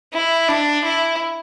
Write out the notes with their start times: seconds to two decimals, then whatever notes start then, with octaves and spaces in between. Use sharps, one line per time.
0.13 E4
0.49 D4
0.84 E4